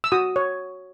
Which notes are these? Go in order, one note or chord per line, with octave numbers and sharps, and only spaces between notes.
E6
F#4 D#6
C#5